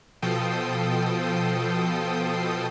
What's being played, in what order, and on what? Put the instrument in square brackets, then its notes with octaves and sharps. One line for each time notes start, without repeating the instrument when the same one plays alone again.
[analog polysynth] B2 F3 A4 G5 D#6 C7